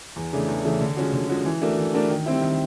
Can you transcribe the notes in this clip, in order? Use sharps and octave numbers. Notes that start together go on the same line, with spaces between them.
E2
C#3 E3 A3 D4
E2
C#3 E3 A3 D4
D3
F3 G#3 C#4 F#4
D3
F3 G#3 C#4 F#4
E3
A3 D4 F#4 A#4
E3
A3 D4 F#4 A#4
D#3
G3 C4 E4
D#3